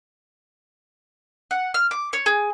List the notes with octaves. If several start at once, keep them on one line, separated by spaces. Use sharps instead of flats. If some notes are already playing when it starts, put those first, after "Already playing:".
F#5
F6
D6
C#5
G#4